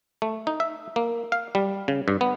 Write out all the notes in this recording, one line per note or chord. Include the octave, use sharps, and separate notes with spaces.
A3
D#4
E5
A#3
F5
G3
C#3
G2
B3